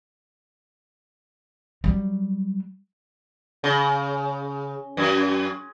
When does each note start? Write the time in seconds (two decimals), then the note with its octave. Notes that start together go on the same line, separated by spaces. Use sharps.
1.84 F#3 G3
3.64 C#3
4.97 F#2